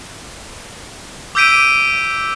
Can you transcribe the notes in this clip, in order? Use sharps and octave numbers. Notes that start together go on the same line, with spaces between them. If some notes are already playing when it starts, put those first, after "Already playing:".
D6 E6 G6 B6 D7 D#7